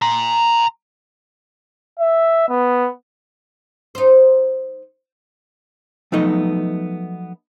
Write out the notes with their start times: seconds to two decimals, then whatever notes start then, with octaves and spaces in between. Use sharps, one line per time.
0.02 A#5 C6
1.99 E5
2.48 B3
3.95 D#4 C5
6.12 F3 F#3 A3 B3 D#4 D#5